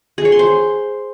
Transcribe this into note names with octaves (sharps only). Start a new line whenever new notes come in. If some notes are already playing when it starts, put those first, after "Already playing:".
G#4
C#5
C6
C5